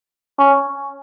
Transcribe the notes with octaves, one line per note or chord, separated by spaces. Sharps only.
C#4